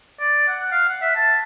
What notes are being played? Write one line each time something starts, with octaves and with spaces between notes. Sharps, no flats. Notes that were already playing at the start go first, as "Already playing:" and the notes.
D5
F#5
F5
F#5
E5
A5